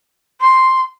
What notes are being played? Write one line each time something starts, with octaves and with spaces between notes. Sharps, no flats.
C6